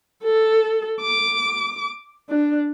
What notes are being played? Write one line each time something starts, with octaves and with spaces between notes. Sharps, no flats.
A4
D6
D4